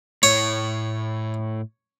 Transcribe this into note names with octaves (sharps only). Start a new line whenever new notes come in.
A2 C#5